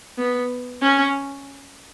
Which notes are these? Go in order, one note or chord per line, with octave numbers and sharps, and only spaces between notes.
B3
C#4